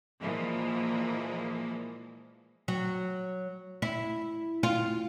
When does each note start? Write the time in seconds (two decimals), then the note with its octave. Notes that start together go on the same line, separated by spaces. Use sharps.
0.21 A#2 E3 F3 G#3 A#3
2.68 F#3
3.82 E4
4.63 F4